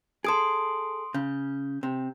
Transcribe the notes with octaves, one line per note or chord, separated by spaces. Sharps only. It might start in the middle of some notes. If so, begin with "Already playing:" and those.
G#4 A4 C6 D#6 D7
C#3 G6
C3